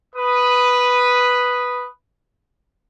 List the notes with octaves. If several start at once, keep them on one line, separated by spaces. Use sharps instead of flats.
B4 D#6